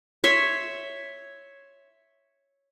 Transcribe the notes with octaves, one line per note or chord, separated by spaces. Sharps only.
C#5 E5 C6